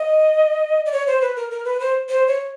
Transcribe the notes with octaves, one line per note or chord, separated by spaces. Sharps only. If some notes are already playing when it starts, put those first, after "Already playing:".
Already playing: D#5
D5
C#5
C5
B4
A#4
A#4
B4
C5
C5
C#5